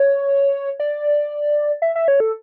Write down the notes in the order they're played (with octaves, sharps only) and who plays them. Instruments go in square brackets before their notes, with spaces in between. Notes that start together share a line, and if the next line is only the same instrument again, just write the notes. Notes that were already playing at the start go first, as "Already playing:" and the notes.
Already playing: [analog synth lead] C#5
D5
E5
E5
C#5
A4